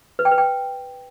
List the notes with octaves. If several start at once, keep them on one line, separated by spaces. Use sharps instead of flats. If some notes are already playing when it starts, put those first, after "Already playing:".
B4
G5
B4
G5